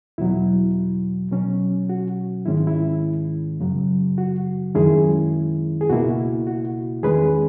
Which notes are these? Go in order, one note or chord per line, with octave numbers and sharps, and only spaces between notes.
E2 B2 F#3 E4
B2 F#3 C#4
F#4
G#2 D#3 G#3 C#4 E4
E4
F#2 C#3 F#3
F#4
F#2 D#3 G#3 C#4 E4 G#4
G#4
C#2 B2 A#3 E4 F#4
F#4
E2 D#3 G#3 C#4 G#4 B4